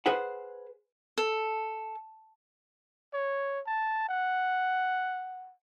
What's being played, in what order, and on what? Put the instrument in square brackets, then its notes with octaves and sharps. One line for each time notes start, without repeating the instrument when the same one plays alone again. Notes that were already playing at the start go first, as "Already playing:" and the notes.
[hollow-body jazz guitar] G#4 B4 C5 F#5
[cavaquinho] A4
[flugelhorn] C#5
A5
F#5